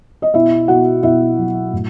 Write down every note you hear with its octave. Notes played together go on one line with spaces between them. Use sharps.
D#5
B2 E4 E5
B2 F#4 F#5
B2 E4 E5
F#3
A2